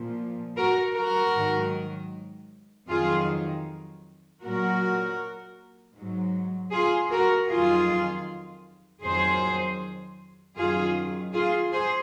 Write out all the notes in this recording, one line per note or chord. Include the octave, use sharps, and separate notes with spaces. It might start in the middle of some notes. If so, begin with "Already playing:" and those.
Already playing: A#2 F3
F#4 A#4
F#4 A#4
G#2 D#3 F#3
F2 D#3 F#3 F4 G#4
A#2 F#3 F#4 A#4
G#2 F#3
F4 G#4
F#4 A#4
F2 D#3 F#3 F4 G#4
F2 D#3 F#3 G#4 C5
F#2 D#3 F#3 F4 G#4
F4 G#4
G#4 C5